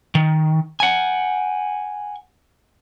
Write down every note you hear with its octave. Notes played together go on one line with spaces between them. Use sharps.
D#3
F#5 G#5